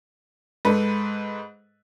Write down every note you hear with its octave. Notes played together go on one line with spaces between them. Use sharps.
G#2 A4 B4